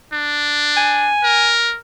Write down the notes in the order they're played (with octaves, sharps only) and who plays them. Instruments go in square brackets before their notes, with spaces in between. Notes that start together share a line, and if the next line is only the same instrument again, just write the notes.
[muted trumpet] D4
[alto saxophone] G#5
[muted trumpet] A#4